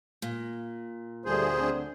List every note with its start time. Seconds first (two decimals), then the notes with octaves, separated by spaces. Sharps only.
0.22 A#2
1.25 D2 G2 D3 G#4 C5
1.58 D3 C4 D4